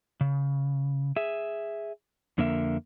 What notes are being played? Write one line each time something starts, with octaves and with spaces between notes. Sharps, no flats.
C#3
G#4 E5
F2 D3 A#3 A#4 E5